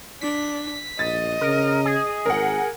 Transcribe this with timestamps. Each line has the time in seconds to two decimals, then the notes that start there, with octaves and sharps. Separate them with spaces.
0.21 D4 B6
0.99 A#1 D#5 A6
1.41 C#3 A#4
1.85 G#4
2.26 G#1 A#4 F#5